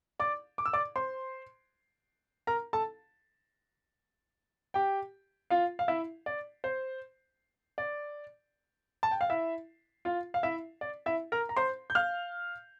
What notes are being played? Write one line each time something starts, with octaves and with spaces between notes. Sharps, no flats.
D5 D6
D6
E6
D5 D6
C5 C6
A#4 A#5
A4 A5
G4 G5
F4 F5
F5
E4 E5
D5
C5
D5
A5
G5
F5
E4 E5
F4 F5
F5
E4 E5
D5
E4 E5
A#4 A#5
A#5
C5 C6
G6
F5 F6